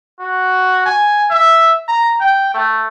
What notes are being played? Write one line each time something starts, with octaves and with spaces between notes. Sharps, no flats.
F#4
G#5
E5
A#5
G5
A3